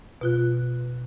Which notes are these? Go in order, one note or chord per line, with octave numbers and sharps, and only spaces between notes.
B2 F4 F#6